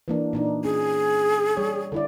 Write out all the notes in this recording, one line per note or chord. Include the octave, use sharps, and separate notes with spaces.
E3 A#3 D4
A#2 D4 D#4
C#4 G#4
G3 C#5
D3 E4 D5